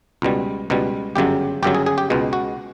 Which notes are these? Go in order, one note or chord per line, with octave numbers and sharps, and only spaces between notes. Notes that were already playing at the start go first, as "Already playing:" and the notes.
C#2 B2 G3
C#2 B2 G3
G1 F#2 C#3 F#3 G4
G1 F#2 C#3 F#3 G4
G#4
G#4
G4
C#2 B2 G#3
F#4